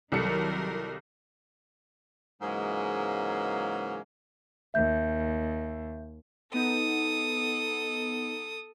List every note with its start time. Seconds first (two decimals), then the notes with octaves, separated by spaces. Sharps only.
0.12 C2 D#3 F#3 A4 A#4 C#7
2.42 G#2 C#3 E3 F#3 G#3 A#3
4.74 D#2 E5 G6
6.54 B3 D#4 A4 D#6